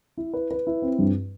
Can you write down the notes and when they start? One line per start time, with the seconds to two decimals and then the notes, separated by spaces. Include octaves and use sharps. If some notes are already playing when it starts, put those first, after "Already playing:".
0.17 E4
0.34 B4
0.51 B4
0.67 E4
0.82 C4
0.99 G2